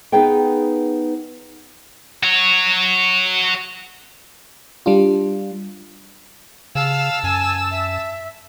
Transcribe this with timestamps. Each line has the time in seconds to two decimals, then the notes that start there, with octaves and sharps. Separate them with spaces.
0.12 B3 D#4 G#4 B4 G5
2.23 F#4 C#5
4.86 G3 D4 F4
6.75 C#3 F5 A5 E6
7.24 F#2 G#5
7.71 E5